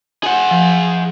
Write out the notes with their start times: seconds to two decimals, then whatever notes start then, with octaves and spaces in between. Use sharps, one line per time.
0.23 G#4 F#5
0.51 F3